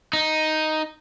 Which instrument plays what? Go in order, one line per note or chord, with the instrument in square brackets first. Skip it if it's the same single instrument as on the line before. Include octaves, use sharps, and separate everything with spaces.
[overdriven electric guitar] D#4